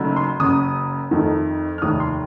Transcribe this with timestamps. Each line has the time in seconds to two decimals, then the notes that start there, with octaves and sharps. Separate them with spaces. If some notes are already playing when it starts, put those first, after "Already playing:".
Already playing: F#1 F#2 D#3 F#3 A3
0.16 C6
0.40 F#1 F#2 C#3 D#6
1.11 F2 D#3 A3
1.78 F6
1.82 F1 D#2 D#3 A3 D#6
2.00 C6